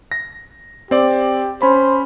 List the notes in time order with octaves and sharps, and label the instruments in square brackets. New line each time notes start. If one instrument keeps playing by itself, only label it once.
[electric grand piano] A#6
[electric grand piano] C4 D5 D6 [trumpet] G4
[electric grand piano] C#4 B5 [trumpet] C5